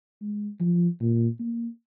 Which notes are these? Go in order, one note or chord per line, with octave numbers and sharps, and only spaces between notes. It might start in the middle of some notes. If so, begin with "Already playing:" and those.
G#3
F3
A#2
A#3